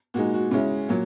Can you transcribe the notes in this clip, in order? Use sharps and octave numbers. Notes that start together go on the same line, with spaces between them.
A#2 G#3 D#4 F#4
F#4
C#3 G#3 C#4 E4
A#2 F#3